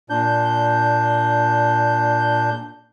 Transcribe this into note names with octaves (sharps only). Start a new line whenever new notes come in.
A#2 D4 G6